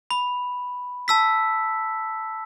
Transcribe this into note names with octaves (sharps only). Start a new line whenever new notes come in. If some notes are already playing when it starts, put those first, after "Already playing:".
B5
A5 E6 B6